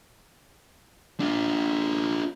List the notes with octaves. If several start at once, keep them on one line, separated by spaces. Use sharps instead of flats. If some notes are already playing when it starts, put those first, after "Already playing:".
D4 F4